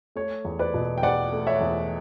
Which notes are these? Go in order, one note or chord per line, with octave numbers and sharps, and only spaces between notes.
A3 C#5
E2
B4 D5
B2
G5
E2 D5 F#5
A3
C#5 E5
E2